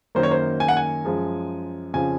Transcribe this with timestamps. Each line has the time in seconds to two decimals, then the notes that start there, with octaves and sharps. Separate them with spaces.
0.15 F#2 D#3 F#3 A#3 C5
0.23 C#5
0.31 C5
0.60 G#5
0.68 F#5
0.77 G#5
1.04 F#2 F3 G#3
1.93 F2 C#3 F3 G#5